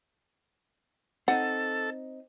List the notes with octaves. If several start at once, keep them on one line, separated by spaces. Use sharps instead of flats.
C4 D#4 A4 F#5